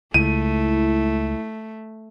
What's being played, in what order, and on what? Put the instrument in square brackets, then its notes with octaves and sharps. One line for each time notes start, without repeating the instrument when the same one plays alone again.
[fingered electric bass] C#2 [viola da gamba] A3 [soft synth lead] E4 [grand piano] D#7